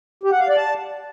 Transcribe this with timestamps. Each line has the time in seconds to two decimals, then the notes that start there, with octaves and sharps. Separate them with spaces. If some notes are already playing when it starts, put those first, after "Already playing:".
0.23 G4
0.32 F#5
0.40 F5
0.48 D5
0.57 A5